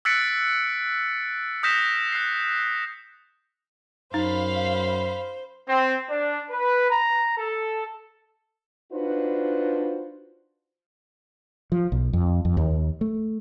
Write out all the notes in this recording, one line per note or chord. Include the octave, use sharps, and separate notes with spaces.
E6 F#6 A6 B6 C#7 D7
D#6 F6 G6 A#6 B6 E7
F#6 C7
F#2 D#4 C5 F5 B5
C4
D4
B4
A#5
A4
D4 D#4 F4 F#4 B4 C5
F3
B1
F2
F2
D#2
A3